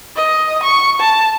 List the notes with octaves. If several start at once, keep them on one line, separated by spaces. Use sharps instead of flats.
D#5
C#6
A5